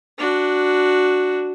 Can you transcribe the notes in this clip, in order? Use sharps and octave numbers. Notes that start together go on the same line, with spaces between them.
D4 F#4